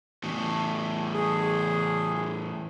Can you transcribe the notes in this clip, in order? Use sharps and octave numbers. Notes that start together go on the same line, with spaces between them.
E2 A2
G#4